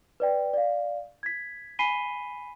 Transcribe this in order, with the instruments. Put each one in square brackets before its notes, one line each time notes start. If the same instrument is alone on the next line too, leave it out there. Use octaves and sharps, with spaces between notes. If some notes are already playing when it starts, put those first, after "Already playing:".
[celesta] B4 D5 G5
D5 F5
G#6 B6
G#5 B5 B6 C7 D#7 G7